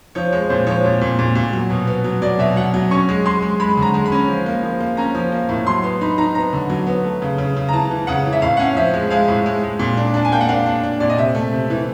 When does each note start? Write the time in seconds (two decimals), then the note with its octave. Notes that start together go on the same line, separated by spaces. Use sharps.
0.15 F3 C#5
0.33 G#3 C#5
0.49 A#2 C5
0.67 F3 C#5
0.84 A#2
1.01 A#2
1.19 A#2
1.35 A#2
1.53 F#3
1.70 B2
1.87 B3
2.04 F#3
2.22 F#3 D5
2.39 B2 E5
2.56 F#3 F#5
2.74 F#3
2.91 C#4 C#6
3.09 G#3
3.25 G#3 C6
3.42 G#3
3.60 G#3 B5
3.77 D3
3.82 A#5
3.94 G#3
4.06 B5
4.12 C#4
4.28 F3
4.46 A#3
4.63 F3
4.80 A#3
4.97 C#4 A#5
5.15 F3
5.32 A#3
5.49 A2
5.67 F#3 C6
5.83 B3 C6
6.01 D#4 B5
6.18 D#4 A#5
6.35 B3 A#5
6.53 D3
6.70 F#3
6.87 B3
7.04 A3
7.22 C#3
7.38 C#3
7.56 C#3
7.69 A#5
7.73 E3 A5
7.90 E3
8.07 C#3 F#5
8.25 E3
8.33 E5
8.42 A2 F5
8.57 C#4 F#5
8.67 F5
8.77 F3 E5
8.94 G#3
9.10 G#3 F5
9.28 A2
9.46 G#3
9.63 G#3
9.79 A#2
9.97 D4
10.14 D4 A5
10.25 G#5
10.32 A#3 G5
10.41 F#5
10.49 D4 F5
10.66 D4
10.83 D4
11.00 A#2 D5
11.09 D#5
11.18 C3 E5
11.35 A3
11.52 C3
11.70 E3